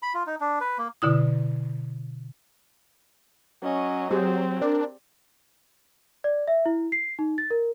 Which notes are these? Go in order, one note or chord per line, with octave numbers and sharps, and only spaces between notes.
B5
F4
D#4
D4
B4
A#3
B2 D3 E4 D#6
F#3 C#4 D#5
F#3 C4 G4 G#4 C5
D4 A#4 D5
D5
E5
E4
C7
D#4
A6
A#4